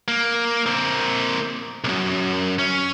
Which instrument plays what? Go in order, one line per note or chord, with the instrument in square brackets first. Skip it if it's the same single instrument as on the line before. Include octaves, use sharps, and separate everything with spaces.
[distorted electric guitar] A#3
A#3 C4
B1 F#2
C#4